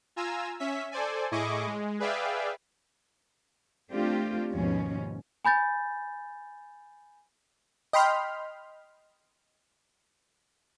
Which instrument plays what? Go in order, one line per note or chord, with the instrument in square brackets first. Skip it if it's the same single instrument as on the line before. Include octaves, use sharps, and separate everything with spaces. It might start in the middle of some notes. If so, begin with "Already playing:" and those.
[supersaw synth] F4 G#5 A#5 E6
C#4 E5 B6
A4 C5 D5 G#5
A2 E4 G#4 D#5 C#6 D6
G#3
G#4 B4 D5 E5 F5 G5
[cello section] A3 C4 D4 F4 G4
D#2 G#2 B2 F3 C#4
[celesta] G#5 B5 G6 A6
[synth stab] D#5 G5 B5 C6 F6